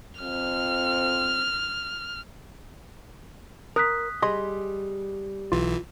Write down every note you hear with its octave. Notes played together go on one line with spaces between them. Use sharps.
F2 C4 F6
A#4 D#6 F#6 B6
G3 G#4 D#5 C6
B1 E3 F4